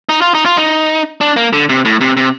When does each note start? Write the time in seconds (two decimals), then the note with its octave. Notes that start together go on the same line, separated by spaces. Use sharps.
0.09 D#4
0.21 F4
0.34 D#4
0.45 F4
0.57 D#4
1.21 D4
1.36 A#3
1.53 D3
1.69 C3
1.85 A2
2.01 C3
2.17 C3